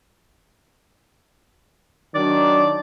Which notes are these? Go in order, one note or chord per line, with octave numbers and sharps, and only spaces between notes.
D#3 F#3 D4 D5